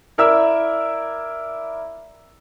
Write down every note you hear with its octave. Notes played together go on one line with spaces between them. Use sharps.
E4 A#4 D5 E5 E6